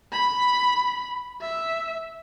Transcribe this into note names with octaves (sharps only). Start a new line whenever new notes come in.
B5
E5